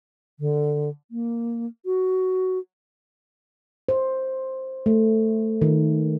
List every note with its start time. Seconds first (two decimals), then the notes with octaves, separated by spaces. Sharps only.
0.40 D3
1.11 A#3
1.86 F#4
3.89 C5
4.86 A3
5.62 D#3